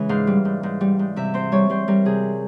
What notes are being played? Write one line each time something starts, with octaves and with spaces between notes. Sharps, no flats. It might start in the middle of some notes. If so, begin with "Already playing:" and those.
Already playing: C#3 E3 G#3
G#2 F5
G3
G#2
G#2
G3
G#2
C3 E5
C4 C5
G3 C#5
G3 C5
G3 A#4
C3 G#4